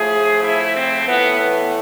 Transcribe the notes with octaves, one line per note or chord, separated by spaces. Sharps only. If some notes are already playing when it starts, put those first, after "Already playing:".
Already playing: A2 F3 A3 G#4
E4
C4
A2 E3 A3 B3
B3